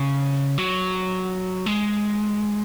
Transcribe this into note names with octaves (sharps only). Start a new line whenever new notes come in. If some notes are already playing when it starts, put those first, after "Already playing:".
Already playing: C#3
F#3
G#3